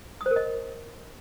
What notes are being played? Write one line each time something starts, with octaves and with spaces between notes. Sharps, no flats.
D#6
C5
A#4
D#5